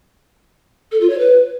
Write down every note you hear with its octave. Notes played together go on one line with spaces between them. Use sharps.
A4
F4
C#5
B4